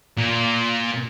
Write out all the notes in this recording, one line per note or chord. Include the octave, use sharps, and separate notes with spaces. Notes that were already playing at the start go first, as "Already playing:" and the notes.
A#2